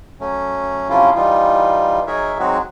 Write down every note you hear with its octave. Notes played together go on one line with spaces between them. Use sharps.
F#3 A3 C#4
C3 F3 F#3 C#4 E4 F4
E3 G3 D#4 F4
F#3 D#4 G#4 A#4 C#5 E5
F#3 G#3 C4 D#4 F#4